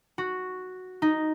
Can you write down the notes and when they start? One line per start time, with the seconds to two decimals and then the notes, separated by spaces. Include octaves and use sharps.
0.18 F#4
1.02 D#4